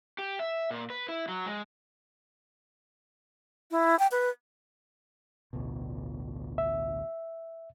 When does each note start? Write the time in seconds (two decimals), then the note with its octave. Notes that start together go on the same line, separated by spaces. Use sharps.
0.18 G4
0.39 E5
0.71 A#2
0.90 B4
1.09 E4
1.28 F#3
1.46 G#3
3.71 E4
3.99 G5
4.11 B4
5.53 A1 D2 B2
6.58 E5